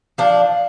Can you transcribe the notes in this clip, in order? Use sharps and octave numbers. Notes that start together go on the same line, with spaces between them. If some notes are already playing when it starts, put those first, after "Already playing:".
F3 D4